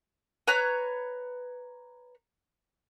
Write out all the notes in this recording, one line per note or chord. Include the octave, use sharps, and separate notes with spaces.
B4 C#5 A#5 F#6